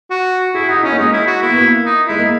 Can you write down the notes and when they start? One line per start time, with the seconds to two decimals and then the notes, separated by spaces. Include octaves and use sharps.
0.11 F#4
0.55 E4 G#4
0.69 D#4 F#4
0.79 E4
0.83 C#4 D#4
0.92 A#3
0.98 G#3 D#4
1.13 E4
1.27 F#4
1.42 A#3 E4
1.50 B3
1.57 A#3
1.86 D#4
2.07 G#3 E4
2.19 A#3